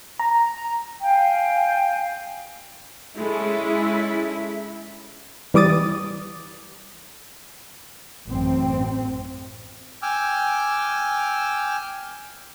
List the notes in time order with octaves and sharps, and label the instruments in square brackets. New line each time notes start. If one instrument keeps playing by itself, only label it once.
[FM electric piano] A#5
[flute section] F5 G5 G#5
[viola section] G#3 C#4 A4 [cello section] E4
[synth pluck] E3 G3 D6 D#6 A6
[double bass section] A1 F#2 C4
[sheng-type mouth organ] G5 G#5 D6 E6 F6